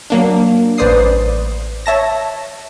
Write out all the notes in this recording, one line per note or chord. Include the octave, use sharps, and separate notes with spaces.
F#3 A#3 D4
A1 B4 C5 D5 D#6 C7
C#5 E5 A5 A#6